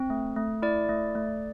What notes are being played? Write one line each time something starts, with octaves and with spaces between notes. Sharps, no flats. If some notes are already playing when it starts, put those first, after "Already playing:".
Already playing: C4
A3
A3
E4 D5
A3
A3